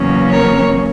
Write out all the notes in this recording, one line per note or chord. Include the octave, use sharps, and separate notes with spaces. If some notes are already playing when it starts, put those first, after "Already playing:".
Already playing: E2 C#3 F#3 A#3 C#4
A#4 C#5